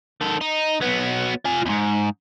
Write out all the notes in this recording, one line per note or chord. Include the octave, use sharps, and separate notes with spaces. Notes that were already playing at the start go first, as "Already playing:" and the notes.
D#3 A4
D#4
F#3 B3
F4 G#5
E2 G#2